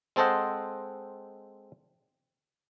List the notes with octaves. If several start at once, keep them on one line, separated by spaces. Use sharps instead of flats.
G#3 C4 A4 C5 D#5 F#5